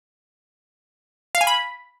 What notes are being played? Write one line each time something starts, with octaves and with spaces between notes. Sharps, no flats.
F5
G#5
B5